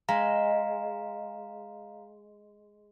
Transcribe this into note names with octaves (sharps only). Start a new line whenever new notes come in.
G#3 F5 A#5